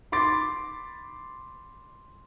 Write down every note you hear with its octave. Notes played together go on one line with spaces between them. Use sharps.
B5 C6 D6 A6